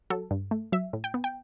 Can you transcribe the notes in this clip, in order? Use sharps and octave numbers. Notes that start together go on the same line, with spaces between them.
F#3 A4
G2
A3
F#3 E5
A2
G5
B3
G5